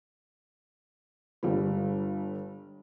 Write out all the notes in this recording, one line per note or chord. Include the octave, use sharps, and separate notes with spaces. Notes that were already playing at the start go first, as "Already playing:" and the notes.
G1 G3